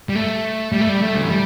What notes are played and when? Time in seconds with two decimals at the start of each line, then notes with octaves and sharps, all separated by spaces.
0.09 G3
0.15 A3
0.73 G3
0.81 A3
0.89 G3
1.02 A3
1.15 D3
1.23 E3
1.30 G3